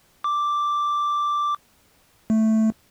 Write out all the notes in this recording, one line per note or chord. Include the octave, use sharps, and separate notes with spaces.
D6
A3